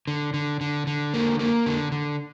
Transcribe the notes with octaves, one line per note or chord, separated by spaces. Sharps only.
D3
D3
D3
D3
A#3
A#3
D3
D3